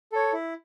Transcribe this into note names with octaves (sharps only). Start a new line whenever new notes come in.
A4 C#5
E4